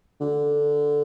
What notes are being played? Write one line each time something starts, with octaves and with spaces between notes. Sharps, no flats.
D3